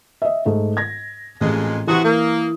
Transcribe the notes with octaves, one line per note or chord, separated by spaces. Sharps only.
D#5 E5
G#2 A3
G#6 A#6
A1 F2 A#2 G#3
C3 E3 F#4 D#6
A#3